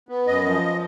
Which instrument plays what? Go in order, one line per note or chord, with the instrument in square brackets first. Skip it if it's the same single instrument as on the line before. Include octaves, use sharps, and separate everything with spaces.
[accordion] B3
F#2 D#5
F3